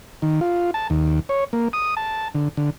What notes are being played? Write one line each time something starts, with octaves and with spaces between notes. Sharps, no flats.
D#3
F4
A5
D#2
C#5
A#3
D#6
A5
D3
D3